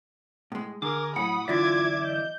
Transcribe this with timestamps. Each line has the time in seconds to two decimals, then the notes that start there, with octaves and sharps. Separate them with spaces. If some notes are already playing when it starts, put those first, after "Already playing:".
0.52 A2 G#3
0.82 D3 G#4 A#4 D6
1.16 A2 F#3 F#5 B5 D#6
1.48 F#2 D3 E3 F4 D5 E5 D6 G#6
2.04 D#5 G6